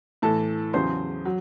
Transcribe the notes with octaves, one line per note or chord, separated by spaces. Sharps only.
A2 E3 A4 A5
E2 C#3 F#3 C5 C6
F#3